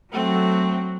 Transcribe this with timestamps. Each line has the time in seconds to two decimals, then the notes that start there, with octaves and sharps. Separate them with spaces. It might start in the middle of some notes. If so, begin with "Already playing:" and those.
0.13 F#3 A3 C4 F#4